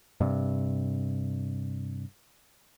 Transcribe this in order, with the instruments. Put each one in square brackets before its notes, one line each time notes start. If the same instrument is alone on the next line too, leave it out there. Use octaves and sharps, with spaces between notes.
[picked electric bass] G2 C3